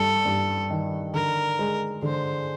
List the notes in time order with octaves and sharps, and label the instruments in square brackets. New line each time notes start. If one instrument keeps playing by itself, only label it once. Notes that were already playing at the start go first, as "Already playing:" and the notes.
Already playing: [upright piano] G2 A3 [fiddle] A4
[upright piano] G2
D#3
[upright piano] D3 [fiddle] A#4
[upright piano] G#3
[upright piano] D3 [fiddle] C5